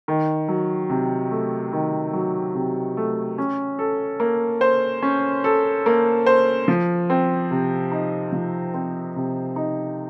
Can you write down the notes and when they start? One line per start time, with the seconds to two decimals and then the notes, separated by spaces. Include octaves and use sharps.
0.08 D#3
0.48 F#3
0.89 C3
1.31 A3
1.73 D#3
2.13 F#3
2.55 C3
2.97 A3
3.38 C#4
3.79 A4
4.20 A#3
4.61 C5
5.02 C#4
5.44 A4
5.86 A#3
6.26 C5
6.68 F3
7.10 C4
7.51 C3
7.92 D#4
8.32 F3
8.74 C4
9.16 C3
9.56 D#4